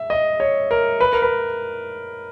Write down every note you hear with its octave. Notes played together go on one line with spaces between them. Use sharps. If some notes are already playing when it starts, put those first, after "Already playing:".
Already playing: E5
D#5
C#5
A#4
B4
A#4
B4